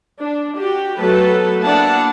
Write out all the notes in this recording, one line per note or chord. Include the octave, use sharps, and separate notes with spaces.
D4
F#4 G4
F#3 A3 B3 A4 B4 A5
A#3 B3 D4 E4 F#5 A5